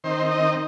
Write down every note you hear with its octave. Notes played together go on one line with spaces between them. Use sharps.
D#3 C4 D#4 C5
D#5